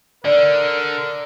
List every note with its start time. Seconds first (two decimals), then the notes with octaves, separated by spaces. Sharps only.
0.25 D3 A#4 D5